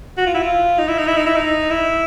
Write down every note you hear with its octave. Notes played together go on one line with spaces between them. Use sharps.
F#4
F4
E4
F4
D#4
E4
D#4
E4
D#4
E4
D#4
E4